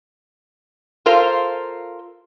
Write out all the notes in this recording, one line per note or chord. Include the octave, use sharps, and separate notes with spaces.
F4 A4 A#4 C5 F5